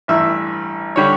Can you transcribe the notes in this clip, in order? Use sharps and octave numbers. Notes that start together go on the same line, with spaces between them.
A1 G2 E3 E5
D3 G3 C#5